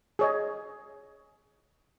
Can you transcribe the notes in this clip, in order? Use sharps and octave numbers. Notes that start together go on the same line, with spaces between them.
G#4 C#5 D#5